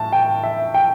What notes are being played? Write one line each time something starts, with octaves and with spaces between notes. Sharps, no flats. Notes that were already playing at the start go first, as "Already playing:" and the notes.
Already playing: A2 A5
G5
E5
G5